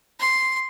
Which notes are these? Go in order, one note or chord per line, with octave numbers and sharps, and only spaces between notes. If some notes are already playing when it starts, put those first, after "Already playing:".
C6